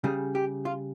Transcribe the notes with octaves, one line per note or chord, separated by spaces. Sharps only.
C#3 G3 G#4
G4
F4